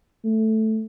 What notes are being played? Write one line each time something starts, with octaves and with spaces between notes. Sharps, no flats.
A3